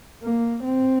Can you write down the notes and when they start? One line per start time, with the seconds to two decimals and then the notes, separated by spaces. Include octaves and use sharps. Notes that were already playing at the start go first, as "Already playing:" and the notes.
0.23 A#3
0.64 C4